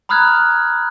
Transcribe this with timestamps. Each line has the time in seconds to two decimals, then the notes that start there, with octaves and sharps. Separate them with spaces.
0.09 A#5 B5 D#6 F6 F#6 G#6